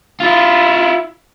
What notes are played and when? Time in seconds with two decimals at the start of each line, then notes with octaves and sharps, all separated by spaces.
0.20 E4 F4